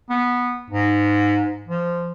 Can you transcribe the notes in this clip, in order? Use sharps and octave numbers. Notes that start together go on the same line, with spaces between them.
B3
G#2
F3